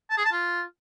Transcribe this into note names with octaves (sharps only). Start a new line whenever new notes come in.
A5
G#4
A5
F4